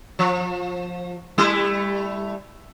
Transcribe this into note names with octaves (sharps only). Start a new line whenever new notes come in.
F3
G3 A3 E4